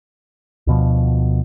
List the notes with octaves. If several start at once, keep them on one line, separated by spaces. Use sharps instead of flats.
D2 B2 F3